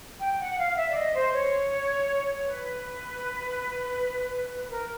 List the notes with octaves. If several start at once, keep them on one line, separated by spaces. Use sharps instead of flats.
G5
F#5
F5
E5
D5
D#5
C5
C#5
B4
A#4